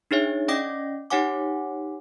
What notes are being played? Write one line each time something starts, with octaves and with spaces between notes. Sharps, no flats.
D4 D#4 G#4 C#5 E5
C#4 D5 D#5 G5 D6 A#6
D#4 G4 C#5 F#5 G#5 D6